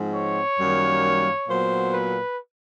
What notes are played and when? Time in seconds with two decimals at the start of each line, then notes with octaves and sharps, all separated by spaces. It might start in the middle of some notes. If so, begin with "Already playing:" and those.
Already playing: G#2 F3 G#3 C4
0.14 C#5
0.58 F#2 D#3 G3 A#3
1.48 A#2 F#3 B3 C5
1.92 B4